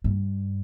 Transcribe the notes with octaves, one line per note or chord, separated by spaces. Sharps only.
G2